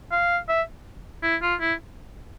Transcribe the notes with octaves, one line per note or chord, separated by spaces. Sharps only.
F5
E5
E4
F4
E4